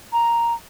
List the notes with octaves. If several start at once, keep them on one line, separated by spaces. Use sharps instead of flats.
A#5